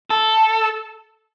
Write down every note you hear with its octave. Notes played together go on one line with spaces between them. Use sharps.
A4